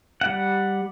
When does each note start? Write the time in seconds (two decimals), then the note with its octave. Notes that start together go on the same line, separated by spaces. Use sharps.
0.21 G3 F#5